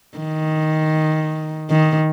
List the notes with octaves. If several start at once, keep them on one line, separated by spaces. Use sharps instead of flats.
D#3
D#3